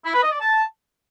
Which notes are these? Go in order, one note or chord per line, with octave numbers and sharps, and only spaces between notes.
E4
B4
D#5
D5
A5